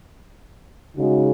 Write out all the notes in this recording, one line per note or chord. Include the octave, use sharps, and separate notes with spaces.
C#3 G#3 D#4 F#4